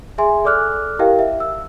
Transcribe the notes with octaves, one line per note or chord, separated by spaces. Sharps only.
G#4 E5 G#5 C6
A4 D5 D6 F6 F#6
E4 G4 A#4 D#5 F5 G5
E5
E6